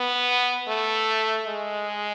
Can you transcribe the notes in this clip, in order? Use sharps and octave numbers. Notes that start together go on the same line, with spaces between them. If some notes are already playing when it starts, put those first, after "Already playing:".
Already playing: B3
A3
G#3